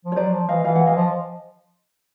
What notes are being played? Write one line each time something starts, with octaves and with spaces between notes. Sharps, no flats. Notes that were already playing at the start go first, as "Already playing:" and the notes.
F3
C#5
F#3 C5 D5
F3
E3 D#5 F5
E3 F5
F#5
E3 D#5 F5
F3